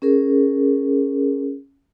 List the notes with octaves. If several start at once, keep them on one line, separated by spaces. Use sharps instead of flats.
C#4 G#4 A#4